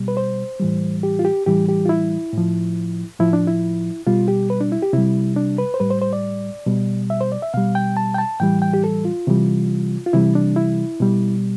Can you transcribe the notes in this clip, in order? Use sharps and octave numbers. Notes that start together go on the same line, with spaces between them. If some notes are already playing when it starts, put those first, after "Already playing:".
Already playing: B2 G3
B4
C5
A2 E3 G3
G4
F4
G4
A2 E3 G3 G4
G4
F4
E4
A2 F3
A2 F3 E4
D4
E4
B2 G3 F4
G4
B4
D4
E4
G4
C3 G3 E4
D4
B4
C5
A2 G3 B4
C5
C5
D5
B2 G3
E5
C5
D5
E5
B2 G3 F5
G5
A5
G5
A5
A2 E3 G3 G5
G5
G4
A4
F4
C3 E3 G3
F4
C3 E3 G3 E4
D4
E4
B2 G3